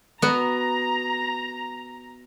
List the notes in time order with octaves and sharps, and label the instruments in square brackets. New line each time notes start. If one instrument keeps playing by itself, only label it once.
[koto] B3 F#4 [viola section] A#5